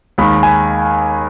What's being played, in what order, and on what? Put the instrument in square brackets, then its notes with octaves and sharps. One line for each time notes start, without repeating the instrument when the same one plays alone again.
[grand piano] D#2 D#3 G#3 B5
G#5